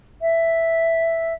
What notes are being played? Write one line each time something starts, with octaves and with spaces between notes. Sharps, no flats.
E5